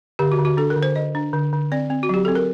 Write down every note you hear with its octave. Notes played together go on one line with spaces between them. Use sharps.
D3 G4
F#4
D3
F#4
D4 A4
A#4
D3
C5
D3 D#5
D4
D3
D3
C4 D5
C4
F#4
F#3 G4
C4 A4
A#4